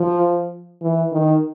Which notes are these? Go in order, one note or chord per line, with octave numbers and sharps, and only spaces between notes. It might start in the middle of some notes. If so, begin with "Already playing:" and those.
Already playing: F3
E3
D#3